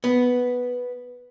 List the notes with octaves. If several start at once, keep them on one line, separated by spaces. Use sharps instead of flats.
B3